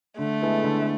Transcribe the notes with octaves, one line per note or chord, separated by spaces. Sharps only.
D3 A3
G#3 B3 E4 A4
D3